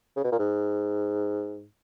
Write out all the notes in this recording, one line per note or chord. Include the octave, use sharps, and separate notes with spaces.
C#3
B2
A#2
G#2